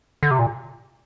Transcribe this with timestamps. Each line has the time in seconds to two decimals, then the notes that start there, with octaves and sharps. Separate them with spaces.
0.23 D3
0.31 C3
0.39 A#2